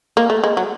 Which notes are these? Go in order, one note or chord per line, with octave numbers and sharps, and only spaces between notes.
A#3
A3
G#3
F#3